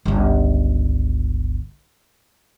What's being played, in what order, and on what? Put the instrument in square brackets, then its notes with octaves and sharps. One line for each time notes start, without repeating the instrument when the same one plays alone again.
[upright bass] G1 C#2